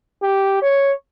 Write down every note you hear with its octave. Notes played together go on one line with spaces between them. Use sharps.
G4
C#5